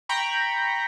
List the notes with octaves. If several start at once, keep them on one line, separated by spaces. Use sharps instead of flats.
G5 A#5 B5 C#6